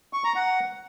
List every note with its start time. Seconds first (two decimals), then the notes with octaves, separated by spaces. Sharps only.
0.13 C#6
0.24 A#5
0.35 F#5